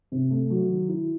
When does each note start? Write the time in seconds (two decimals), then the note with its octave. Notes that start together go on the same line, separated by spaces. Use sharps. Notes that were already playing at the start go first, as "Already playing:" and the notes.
0.12 C3
0.31 A3
0.50 F#3
0.68 D#3
0.89 E4